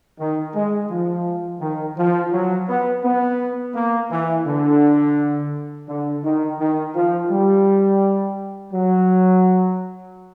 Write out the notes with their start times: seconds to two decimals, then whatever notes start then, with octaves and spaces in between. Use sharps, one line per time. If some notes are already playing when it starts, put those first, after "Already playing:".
0.19 D#3
0.54 G#3
0.90 F3
1.61 D#3
1.97 F3
2.32 F#3
2.68 B3
3.03 B3
3.74 A#3
4.11 E3
4.46 D3
5.88 D3
6.23 D#3
6.59 D#3
6.94 F3
7.30 G3
8.73 F#3